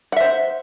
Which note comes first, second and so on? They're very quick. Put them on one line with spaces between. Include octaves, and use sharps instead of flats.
F#5 E5 C5